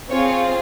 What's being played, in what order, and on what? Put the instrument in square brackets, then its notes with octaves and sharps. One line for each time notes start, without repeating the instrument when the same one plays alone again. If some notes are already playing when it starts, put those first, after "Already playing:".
[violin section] C4 F4 G#4 C#5